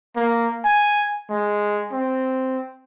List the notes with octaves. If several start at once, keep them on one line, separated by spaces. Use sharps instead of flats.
A#3
G#5
G#3
C4